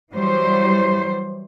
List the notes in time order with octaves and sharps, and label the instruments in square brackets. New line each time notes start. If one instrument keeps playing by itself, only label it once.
[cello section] E3 F#3 G3 C5